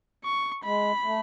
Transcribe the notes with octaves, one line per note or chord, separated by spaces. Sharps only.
C#6
G#3 B5
A3